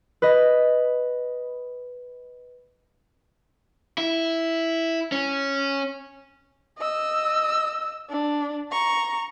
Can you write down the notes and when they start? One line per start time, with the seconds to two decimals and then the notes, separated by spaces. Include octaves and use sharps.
0.22 B4 D#5
3.98 E4
5.12 C#4
6.78 D#5 E6
8.10 D4
8.72 A#5 C#6